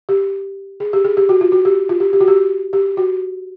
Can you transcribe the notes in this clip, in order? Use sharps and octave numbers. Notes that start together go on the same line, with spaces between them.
G4
G#4
G4
G#4
G4
F#4
F4
F#4
G4
F4
G4
G4
F#4
G4
G4
F#4